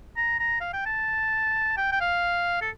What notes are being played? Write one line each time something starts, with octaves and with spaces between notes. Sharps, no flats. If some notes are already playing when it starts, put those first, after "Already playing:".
A#5
A#5
F5
G5
A5
G5
G5
F5
A4